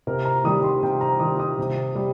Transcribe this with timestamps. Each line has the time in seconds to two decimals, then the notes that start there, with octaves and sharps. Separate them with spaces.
0.07 C3 A#4
0.25 A#5
0.44 D#3 G3 D#6
0.64 C6
0.83 C3 G5
1.01 A#5
1.20 D#3 G3 D#6
1.39 D#6
1.59 C3
1.95 G3